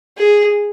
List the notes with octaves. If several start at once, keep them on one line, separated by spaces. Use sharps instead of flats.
G#4